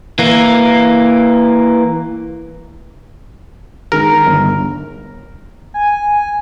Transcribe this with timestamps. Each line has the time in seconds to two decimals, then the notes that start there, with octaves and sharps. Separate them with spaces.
0.19 E3 A#3
3.92 D#3 G#3 A#4
4.26 G1
5.74 G#5